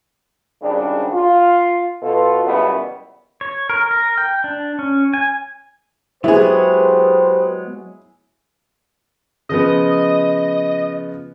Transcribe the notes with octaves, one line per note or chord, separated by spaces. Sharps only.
G#1 G#2 C#3 G3 D4
F4
B2 F4 A4
C#2 F#2 B2 E3 G3 B3
C#5
A#4
A#4
G5
D4
C#4
G#5
F#3 G#3 B3 E4 G4 G#4 B4 C5
C#3 F3 B3 D#5